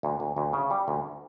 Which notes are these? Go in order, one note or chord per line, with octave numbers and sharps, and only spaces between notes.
D2
D2
D2
C#3
G3
D2